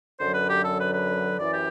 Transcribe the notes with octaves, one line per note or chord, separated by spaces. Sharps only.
F#2 D3 F#3 C5
B4
G4
A4
B4
B4
F#2 E3 D5
G4